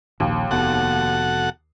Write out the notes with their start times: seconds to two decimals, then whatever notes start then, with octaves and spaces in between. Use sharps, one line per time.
0.20 D#1 A#1 D#2
0.51 F1 B3 F#4 A4 F#5